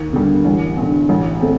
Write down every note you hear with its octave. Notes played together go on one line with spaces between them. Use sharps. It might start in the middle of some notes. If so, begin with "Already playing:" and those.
Already playing: D#2
D3 G3
A1
G2 D3
A1
A3 C4